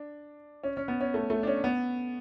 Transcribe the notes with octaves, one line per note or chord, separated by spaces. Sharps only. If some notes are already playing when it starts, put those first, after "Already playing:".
Already playing: D4
C#4
C#4
B3
C#4
A3
A3
D4
C#4
B3